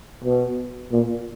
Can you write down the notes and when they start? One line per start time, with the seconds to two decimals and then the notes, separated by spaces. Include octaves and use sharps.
0.24 B2
0.92 A#2